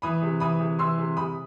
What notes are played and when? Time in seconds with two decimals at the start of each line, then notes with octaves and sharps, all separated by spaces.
0.02 E3 B5 D#6
0.22 C3
0.40 E3 B5 D#6
0.60 C3
0.79 E3 C6 E6
0.98 C3
1.17 C3 B5 D#6